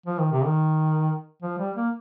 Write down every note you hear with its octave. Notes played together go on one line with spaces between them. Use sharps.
F3
D#3
C3
D#3
F3
G3
A#3